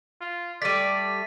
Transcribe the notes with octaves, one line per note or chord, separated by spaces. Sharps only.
F4
G3 A3 D5 A6 B6 D#7